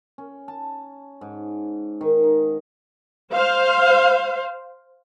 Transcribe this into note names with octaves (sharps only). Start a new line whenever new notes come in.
C#4
A5
G#2
D#3
D#4
C5 F5